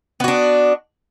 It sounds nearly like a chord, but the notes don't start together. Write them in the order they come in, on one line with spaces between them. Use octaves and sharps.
B3 F#4 D4